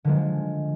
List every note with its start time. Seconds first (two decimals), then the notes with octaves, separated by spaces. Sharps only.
0.04 D3 F3 G#3